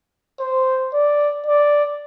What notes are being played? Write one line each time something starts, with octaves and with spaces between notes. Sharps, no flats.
C5
D5
D5